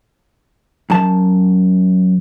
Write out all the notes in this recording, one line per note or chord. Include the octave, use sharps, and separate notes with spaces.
F#2 A5